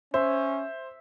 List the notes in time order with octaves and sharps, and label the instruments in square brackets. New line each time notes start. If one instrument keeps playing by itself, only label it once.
[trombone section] C#4 [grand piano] C5 [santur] E5